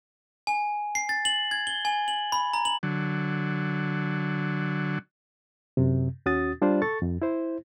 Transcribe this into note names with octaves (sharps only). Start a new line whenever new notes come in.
G#5
C7
A6
F#7
G#6
G7
G#5
F#7
B5
A#5
F#7
D3 F#3
F#2 C3
D#2 C#4 F#4 D#6 A6
G3 D4 F4 C5 D5
A4 C#6 A6
F2
E4 C5